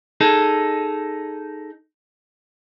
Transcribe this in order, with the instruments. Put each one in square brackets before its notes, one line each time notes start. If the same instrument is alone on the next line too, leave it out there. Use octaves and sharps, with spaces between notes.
[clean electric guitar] D#4 G#4 A4